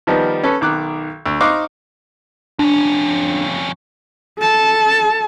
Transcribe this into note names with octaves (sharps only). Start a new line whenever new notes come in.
D#3 F3 G3 B3 D#4
C#4 A4 B4
B1 D#3 D6 F#6
D2
D#4 C5 F5 C#6 D6 F#6
F2 C#4 D4
A4 A5